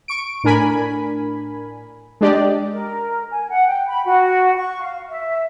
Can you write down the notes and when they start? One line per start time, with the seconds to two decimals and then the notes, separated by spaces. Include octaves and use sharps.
0.08 C#6 D7
0.44 A2 D4 A#4 G#5 B5
2.21 G#3 D4 G4 D5 D#5
2.71 A#4
3.31 G#5
3.50 F#5
3.68 G5
3.88 B5
4.06 F#4
4.57 C#6
4.82 F5
5.09 E5